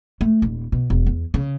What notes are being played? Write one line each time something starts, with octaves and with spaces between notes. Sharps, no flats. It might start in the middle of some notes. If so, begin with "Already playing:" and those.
A3
D#1
B2
E1
E2
C#3